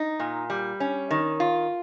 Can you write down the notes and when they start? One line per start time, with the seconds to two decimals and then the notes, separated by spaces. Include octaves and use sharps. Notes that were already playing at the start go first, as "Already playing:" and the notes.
Already playing: D#4
0.20 A#2
0.50 G3
0.80 C#4
1.11 D#3
1.40 F4